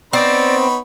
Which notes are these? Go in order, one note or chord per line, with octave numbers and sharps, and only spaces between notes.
B3 C4 D#4 C#5 D5 B5